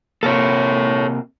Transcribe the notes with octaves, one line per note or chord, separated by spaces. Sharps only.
C3 A#3 A4 C#5